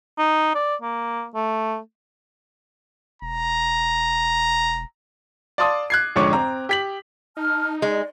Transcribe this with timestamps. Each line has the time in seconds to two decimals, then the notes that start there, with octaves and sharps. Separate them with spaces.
0.18 D#4
0.55 D5
0.82 A#3
1.35 A3
3.22 E1 A#5
5.58 D5 F5 A5 C6 D6 D#6
5.90 F#6 G#6 C7
6.16 F2 G#2 D3 C#5 C#6 D6
6.33 C4 A#5
6.69 G4 B6 F#7
7.37 D#4 A5 F6
7.82 G#3 D5